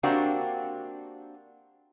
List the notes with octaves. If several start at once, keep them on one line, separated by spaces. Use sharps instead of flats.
A#3 C4 D4 F#4 G4